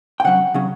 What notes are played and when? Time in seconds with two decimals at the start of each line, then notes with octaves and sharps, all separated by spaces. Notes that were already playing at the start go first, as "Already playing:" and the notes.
0.20 G5
0.24 C#3 F#3 C#4 F#5
0.54 C#3 F#3 C#4